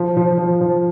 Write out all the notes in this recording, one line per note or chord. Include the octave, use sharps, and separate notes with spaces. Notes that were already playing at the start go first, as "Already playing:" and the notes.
Already playing: F3
F3
F3
F3